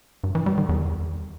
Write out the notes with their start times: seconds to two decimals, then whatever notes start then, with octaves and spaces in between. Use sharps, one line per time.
0.24 G2
0.35 E3
0.46 G3
0.58 D#3
0.69 E2